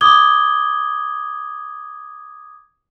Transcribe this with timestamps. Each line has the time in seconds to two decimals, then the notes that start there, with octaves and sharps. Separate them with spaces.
0.01 D6 D#6 G#6 G7